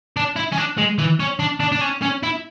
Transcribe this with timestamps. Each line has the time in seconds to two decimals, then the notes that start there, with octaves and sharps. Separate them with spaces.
0.17 D4
0.36 E4
0.53 C#4
0.58 D4
0.78 G#3
0.98 E3
1.20 C#4
1.39 D4
1.60 D4
1.72 D4
1.81 C#4
2.02 C#4
2.23 E4